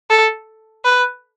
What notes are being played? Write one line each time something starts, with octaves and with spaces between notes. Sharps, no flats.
A4
B4